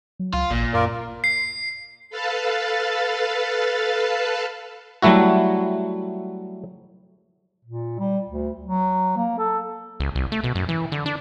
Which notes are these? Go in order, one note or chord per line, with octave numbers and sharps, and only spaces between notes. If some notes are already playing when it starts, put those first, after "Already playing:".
F#3
C#2 F4
A1 A#2
F#2 F4 A#4 D5
C7
A4 B4 F5 A5
F#3 G3 A3 E4 F#4
A#2
G3
D2
F#3
A#3
A4
C#2
C2
A3
B2
F#2
E3
D3
D4